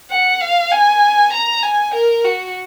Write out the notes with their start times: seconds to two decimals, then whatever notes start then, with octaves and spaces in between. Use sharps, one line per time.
0.11 F#5
0.41 F5
0.72 G#5
1.33 A#5
1.63 G#5
1.94 A#4
2.25 F#4